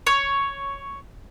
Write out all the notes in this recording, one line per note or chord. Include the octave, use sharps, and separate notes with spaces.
C#5